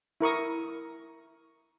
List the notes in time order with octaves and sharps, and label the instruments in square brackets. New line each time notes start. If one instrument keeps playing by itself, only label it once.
[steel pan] E4 A#4 C#6 D#6